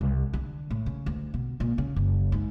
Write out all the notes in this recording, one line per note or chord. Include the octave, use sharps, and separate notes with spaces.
C2
D3
A2
C#3
D2
B2
A#2
C#3
F#1
G#2